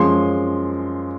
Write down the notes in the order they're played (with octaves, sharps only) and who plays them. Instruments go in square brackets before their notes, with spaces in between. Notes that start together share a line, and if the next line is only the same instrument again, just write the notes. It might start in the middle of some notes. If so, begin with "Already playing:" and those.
Already playing: [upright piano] F#2 F3 G#3 C6